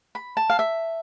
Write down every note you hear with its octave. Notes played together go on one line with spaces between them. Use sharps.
B5
A5
F5
E5